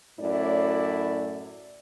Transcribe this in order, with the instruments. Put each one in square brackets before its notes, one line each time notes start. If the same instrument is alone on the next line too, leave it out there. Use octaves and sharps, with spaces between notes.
[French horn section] F#2 A2 E4 D5